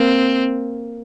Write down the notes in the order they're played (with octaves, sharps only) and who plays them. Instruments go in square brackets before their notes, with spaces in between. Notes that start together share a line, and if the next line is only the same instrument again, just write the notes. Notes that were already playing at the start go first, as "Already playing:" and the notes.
Already playing: [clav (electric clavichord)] A#3 [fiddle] C4